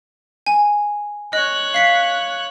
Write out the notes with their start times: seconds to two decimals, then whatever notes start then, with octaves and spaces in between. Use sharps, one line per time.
0.47 G#5
1.33 C#5 D#5 F#6
1.74 F5 B6 C7